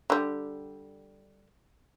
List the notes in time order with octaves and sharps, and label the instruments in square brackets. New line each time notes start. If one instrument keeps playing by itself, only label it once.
[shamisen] D3 G3